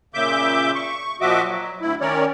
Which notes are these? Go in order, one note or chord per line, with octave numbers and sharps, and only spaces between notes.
A#2 C#3 E5 D6 G6
C#6
A#2 F3 F#4 D#5 E5 D6
F#3
D2 E4
D#3 C#4 A#4 C#5 D5